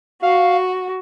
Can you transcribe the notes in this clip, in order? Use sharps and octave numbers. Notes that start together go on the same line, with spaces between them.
F#4 F5